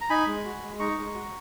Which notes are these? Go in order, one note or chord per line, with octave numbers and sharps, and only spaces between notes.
A#5
D#4 G#5 B5
G#3
F#4
G#3
D#4 A#5 C#6
G#3
F#4